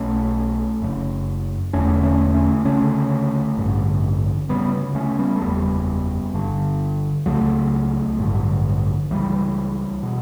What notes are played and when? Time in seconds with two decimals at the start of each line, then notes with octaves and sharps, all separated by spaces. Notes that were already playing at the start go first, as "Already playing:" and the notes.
Already playing: B1 B2 A3 C#4
0.81 F#1 F#2 C#3
1.73 E1 E2 D3 A3 C#4
2.03 A3 C#4
2.34 A3 C#4
2.65 D2 C#3 A3 C#4
3.57 A1 G2 D3
4.49 D2 C#3 G3 B3
4.95 A3 C#4
5.19 G3 B3
5.36 A3
5.41 F#1 E2 C#3 G3 B3
6.34 G1 G2 D3
7.26 C#2 C#3 F#3 A3
8.19 A1 G2 D3
9.10 C#2 C#3 E3 G3
10.03 B2